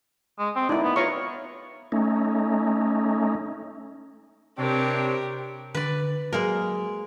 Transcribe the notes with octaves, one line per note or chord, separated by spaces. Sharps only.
G#3
C4
D#4 E4 D5
B3
F4 C#5 A#5 C#6
A3 C#4 D#4
C3 C4 D4 G4 A#4 C#5
D3 B4 D5
F#3 G#3 A#3 A#4